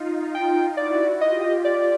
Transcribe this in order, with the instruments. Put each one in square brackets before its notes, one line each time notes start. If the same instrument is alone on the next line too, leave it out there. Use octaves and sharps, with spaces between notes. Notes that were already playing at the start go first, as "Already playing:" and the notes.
Already playing: [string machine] D#4 F4
[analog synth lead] G5
[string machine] E4 F#4 [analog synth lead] D5
[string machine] F4 G4 [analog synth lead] D#5
[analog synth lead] D5